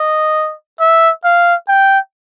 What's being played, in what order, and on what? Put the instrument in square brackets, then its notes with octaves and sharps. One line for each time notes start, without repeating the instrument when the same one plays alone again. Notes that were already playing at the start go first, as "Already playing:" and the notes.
Already playing: [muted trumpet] D#5
E5
F5
G5